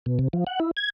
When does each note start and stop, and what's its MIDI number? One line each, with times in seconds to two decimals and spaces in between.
0.06 0.19 47
0.19 0.28 48
0.33 0.44 53
0.47 0.59 78
0.60 0.71 64
0.77 0.90 92